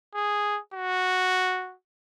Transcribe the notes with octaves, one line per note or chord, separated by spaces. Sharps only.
G#4
F#4